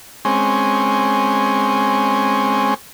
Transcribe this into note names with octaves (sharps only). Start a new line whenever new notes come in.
G#3 C4 C#4